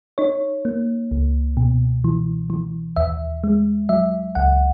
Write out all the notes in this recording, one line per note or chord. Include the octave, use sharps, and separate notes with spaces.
D#4 C#5
A#3
C#2
B2
E3
E3
D#2 E5
G#3
F#3 E5
C#2 F#5